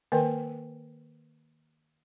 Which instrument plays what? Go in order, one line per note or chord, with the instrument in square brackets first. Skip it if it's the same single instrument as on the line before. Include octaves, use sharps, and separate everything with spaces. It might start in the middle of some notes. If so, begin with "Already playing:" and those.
[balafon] D#3 A#3 A#4 B4 G5